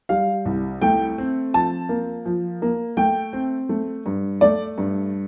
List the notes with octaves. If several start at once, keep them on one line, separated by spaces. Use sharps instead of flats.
G3 F5
C2
A3 G5
C4
F3 A5
A#3
F3
A#3
A3 G5
C4
A3
G2
A3 D5
G2